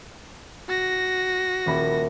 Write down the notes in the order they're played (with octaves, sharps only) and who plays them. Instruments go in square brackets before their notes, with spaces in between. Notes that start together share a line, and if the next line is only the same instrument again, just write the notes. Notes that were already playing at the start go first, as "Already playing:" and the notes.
[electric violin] F#4 A#6
[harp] D#1 B5